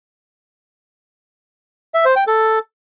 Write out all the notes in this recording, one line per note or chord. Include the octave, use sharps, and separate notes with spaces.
E5
C5
G5
A4